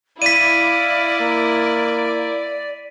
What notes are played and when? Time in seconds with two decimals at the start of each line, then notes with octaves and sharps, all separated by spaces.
0.22 E4 D5 F5 D6 B6 D#7
1.20 A#3